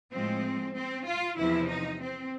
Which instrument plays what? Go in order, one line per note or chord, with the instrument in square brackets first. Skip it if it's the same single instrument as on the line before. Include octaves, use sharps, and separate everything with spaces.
[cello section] A2 F3 G#3 C4
C4
F4
E2 C3 F3 E4
D#4
C4